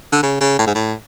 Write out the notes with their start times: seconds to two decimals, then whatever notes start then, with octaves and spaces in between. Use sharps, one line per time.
0.12 D3
0.23 C#3
0.41 C#3
0.59 A2
0.67 G#2
0.75 A2